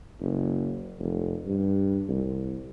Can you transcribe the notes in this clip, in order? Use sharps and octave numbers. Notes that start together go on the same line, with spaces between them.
F#1
F1
G2
C2